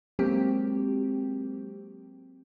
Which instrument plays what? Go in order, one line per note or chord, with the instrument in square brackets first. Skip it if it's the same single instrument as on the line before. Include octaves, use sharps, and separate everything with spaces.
[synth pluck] F#3 G#3 A#3 C4 G4